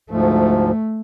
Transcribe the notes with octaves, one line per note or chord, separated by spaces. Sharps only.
D2 G#2 F3 A3